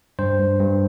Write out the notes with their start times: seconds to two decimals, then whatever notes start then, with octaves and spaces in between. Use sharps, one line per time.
0.19 G2 C5
0.39 G2
0.59 G2